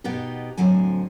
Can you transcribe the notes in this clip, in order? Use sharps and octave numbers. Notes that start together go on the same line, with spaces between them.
B2 B3 D#4 G4
F2 A2 D3 F#3 C5 G#5